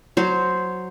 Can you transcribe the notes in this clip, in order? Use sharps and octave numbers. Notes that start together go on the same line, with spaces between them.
F#3 C5